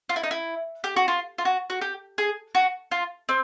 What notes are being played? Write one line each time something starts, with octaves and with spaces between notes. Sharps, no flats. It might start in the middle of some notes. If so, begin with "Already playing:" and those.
F4
E4
D#4
E4
G4
F#4
F4
F4
F#4
F#4
G4
G#4
F#4
F4
C4